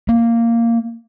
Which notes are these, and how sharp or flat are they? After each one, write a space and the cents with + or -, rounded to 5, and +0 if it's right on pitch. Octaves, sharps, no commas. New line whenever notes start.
A#3 -10